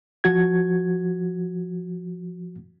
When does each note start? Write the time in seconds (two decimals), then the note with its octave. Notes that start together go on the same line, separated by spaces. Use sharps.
0.24 F3 F#4 G#6